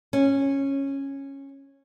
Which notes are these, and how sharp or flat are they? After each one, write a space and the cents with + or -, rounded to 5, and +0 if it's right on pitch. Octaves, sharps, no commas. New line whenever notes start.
C#4 -10